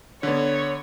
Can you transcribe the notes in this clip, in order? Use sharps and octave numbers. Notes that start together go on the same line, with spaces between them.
D3 B3 C#5